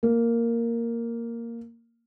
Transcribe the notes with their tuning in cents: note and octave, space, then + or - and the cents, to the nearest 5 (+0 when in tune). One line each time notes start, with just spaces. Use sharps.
A#3 -5